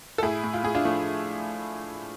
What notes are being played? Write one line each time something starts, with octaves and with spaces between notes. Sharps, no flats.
A4
A2 E4 G#4
A2
F4
A2 G#4
D4 F4
F3 A3